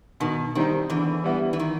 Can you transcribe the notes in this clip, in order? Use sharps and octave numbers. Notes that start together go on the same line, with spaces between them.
B2 D#3
D#3 G3 C4 D#4
E2 D3 E3
G3 B3 E4
E3
D#3